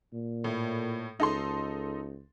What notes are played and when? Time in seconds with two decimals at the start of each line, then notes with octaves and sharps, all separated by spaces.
0.13 A#2
0.44 A2
1.20 C#2 D#4 A4 C6